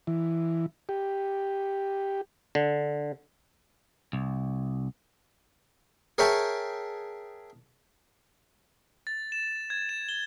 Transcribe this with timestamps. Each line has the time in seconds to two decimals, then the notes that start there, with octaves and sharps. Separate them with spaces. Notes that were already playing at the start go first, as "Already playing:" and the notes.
0.07 E3
0.89 G4
2.55 D3
4.13 C2
6.18 G#4 A#4 C#5 E5 G5 A5
9.07 A6
9.32 E7
9.70 G#6
9.89 E7
10.09 G7